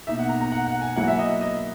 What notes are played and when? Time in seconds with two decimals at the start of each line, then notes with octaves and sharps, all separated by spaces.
0.07 B2 A#3 D#4 E5
0.19 F#5
0.29 A#5
0.41 A#5
0.52 F#5
0.67 F#5
0.81 G#5
0.96 F#3 A#3 E4 F#5
1.08 E5
1.19 D#5
1.41 D#5